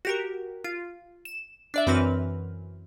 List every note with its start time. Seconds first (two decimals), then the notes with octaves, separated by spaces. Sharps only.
0.05 F#4 G4 A#4
0.64 F4
1.25 E7
1.74 D4 D5 E5
1.87 F#2 E3 C4 F#4 B4 F6